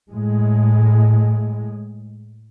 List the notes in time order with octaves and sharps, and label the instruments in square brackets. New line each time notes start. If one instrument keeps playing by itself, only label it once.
[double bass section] A2 G#3